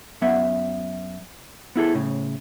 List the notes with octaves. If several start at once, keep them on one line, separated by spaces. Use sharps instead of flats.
F#2 B3 E5 F#5
B3 E4 G#4 A4
A2 C#3